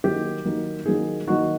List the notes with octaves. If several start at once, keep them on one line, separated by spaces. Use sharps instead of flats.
D#3 F#3 A#3 D#4 G4
D#3 F#3 A#3 D#4
D#3 F#3 A#3 D#4 G#4
D#3 F#3 A#3 D#4 F#4